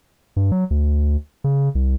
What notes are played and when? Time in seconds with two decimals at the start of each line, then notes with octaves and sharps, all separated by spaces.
0.36 G2
0.52 F#3
0.71 D2
1.44 C#3
1.75 C2